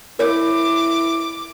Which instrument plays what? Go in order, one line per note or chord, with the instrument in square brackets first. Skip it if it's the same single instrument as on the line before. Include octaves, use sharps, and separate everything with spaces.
[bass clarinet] E4 [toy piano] A#4 C#5 [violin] D6